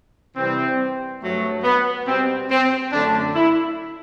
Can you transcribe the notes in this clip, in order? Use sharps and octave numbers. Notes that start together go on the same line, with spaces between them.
C3 E3 G3 C4
G2 F#3 A3
B3
B2 G3 C4
C4
F#2 D3 A3 D4
E4